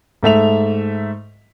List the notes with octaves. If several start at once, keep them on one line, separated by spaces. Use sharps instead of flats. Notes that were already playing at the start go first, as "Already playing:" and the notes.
G#2 A3 E5 F7